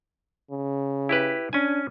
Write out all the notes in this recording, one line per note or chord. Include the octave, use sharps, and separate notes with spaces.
C#3
E4 G4 B4
C#4 D4 G#5